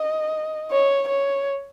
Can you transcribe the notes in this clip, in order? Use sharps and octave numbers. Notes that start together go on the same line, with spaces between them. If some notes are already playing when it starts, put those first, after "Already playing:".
Already playing: D#5
C#5
C#5